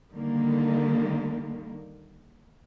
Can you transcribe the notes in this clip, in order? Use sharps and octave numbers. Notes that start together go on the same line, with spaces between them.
D3 D#3 G3 A#3